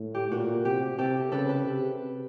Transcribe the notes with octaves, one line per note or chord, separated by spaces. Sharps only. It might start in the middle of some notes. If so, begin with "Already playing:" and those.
Already playing: A2
G4
A#2 F#4
C3 G4
C3 G4 A4
C#3 A4 B4
A4 B4
C3